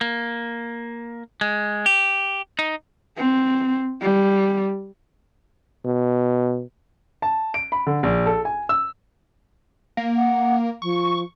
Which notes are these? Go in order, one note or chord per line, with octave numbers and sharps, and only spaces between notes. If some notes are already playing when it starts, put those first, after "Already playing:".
A#3
G#3
G4
D#4
C4
G3
B2
A5
D7
B5
D3
A#1
A4
G#5
E6
A#3
F#5
F3 C#6